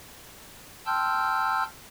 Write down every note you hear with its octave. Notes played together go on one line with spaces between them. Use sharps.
G5 A5 C6 E6 F6 G6